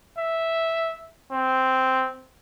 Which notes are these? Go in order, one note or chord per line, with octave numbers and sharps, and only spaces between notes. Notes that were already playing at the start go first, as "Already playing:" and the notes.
E5
C4